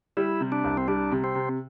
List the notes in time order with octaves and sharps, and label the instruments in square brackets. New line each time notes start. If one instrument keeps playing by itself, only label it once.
[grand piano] G3 [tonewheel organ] E4
[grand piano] C3
[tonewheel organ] D4
[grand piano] C2
[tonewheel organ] C4
[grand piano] G3 [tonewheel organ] D4
[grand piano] C3
[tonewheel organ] C4
[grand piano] C3